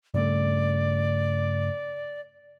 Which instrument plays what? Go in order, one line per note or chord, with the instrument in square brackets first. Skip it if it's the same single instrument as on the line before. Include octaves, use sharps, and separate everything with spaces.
[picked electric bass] G2 C#3 A3 [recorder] D5